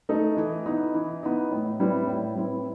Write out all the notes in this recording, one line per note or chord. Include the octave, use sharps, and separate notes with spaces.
A3 D#4 A4
E3
B3 D#4
E3
B3 D#4
A2
G3 C4 E4 B4
A2
G3 C4 E4 B4